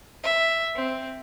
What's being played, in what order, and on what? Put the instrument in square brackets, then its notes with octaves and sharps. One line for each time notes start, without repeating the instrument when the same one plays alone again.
[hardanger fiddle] E5
C4